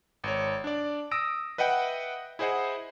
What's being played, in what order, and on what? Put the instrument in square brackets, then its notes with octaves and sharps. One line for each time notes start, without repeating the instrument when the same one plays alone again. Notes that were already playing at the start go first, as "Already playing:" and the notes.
[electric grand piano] G#1 C#5
D4 D5
D#6 E6 A#6 D7
B4 D#5 E5 F#5 G5
E4 G#4 C5 D#5 F#5